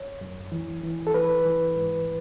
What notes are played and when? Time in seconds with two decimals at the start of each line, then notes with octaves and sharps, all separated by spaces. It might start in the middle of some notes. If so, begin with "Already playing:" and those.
Already playing: C#5
0.21 F#2
0.52 E3
0.83 E3
1.07 A4
1.14 E3 B4
1.45 E3
1.76 G#2